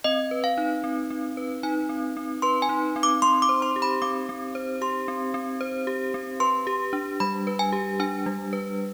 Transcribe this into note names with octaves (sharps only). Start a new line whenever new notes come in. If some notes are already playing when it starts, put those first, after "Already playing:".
C4 D#5
B4
F5
D#4
C4
C4
B4
D#4 G#5
C4
C4
B4 C6
G#5
D#4
C4
D6
C4 C6
D6
C5
C6
G4
B5
C4 D6
C4
C5
G4 C6
C4
C4
C5
G4
C4
B4 C6
G4
D4
G3 B5
B4
G#5
G4
D4 G#5
G3
B4